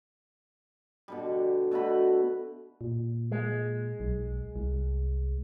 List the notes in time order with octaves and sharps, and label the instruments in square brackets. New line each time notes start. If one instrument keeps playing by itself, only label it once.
[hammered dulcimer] B2 D3 G3
B2 A3 F#4 B5
[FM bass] A#2
[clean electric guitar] G#3
[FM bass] B1
C2